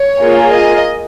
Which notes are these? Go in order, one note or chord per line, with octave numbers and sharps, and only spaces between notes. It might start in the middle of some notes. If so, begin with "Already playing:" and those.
Already playing: C#5
A#3 F4 G#4
D#5